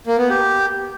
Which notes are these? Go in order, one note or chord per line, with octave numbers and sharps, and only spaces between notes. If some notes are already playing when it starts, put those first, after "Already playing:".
A#3
B3
G4